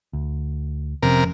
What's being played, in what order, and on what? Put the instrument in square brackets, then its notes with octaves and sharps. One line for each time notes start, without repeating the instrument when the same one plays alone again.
[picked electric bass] D2
[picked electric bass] F1 F3 C#4 [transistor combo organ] C3 A#4